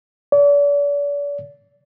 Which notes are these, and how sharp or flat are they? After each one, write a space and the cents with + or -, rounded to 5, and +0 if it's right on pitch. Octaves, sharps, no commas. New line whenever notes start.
D5 -40